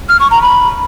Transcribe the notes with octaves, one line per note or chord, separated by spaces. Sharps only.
F6
C#6
A#5
B5